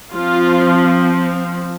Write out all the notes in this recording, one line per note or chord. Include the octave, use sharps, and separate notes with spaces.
F3 C4 F4